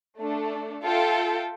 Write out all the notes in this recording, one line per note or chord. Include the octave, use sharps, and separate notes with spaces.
A3 D4 A4
F4 A4 E5 G5